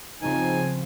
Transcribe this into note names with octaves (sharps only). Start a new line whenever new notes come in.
C#3 F3 C4 D#4 G#5